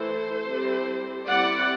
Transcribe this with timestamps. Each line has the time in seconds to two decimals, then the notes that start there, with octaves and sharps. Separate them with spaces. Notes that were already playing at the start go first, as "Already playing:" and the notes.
Already playing: E3 A3 E4 A4 C5
0.46 G3 C4 E4
1.27 G3 C4 E4 D5 F#5